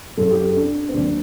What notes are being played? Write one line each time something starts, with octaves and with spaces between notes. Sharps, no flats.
F#2 F#3 A4
G4
A4
D4
C4
D#2 D#3 F#3 D4